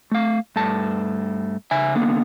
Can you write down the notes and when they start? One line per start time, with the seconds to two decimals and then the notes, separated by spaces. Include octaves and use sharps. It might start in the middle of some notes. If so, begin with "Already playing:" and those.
0.12 A3 F5
0.56 G2 A3 A5
1.71 C#3 E5 G#5
1.95 D3 A#3 B3